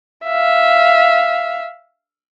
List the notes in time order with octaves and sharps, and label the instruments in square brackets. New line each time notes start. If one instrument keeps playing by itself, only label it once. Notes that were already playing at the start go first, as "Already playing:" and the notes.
[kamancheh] E5 F5